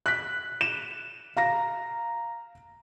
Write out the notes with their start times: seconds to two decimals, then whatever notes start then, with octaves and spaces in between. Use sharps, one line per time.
0.06 F#6 B6
0.61 E7
1.37 F5 A#5 A#6